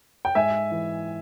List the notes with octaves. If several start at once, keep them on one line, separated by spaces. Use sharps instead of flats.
G5
G#2 E5 G#5
E3